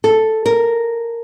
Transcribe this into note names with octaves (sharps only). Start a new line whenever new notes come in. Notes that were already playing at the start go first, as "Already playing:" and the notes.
A4
A#4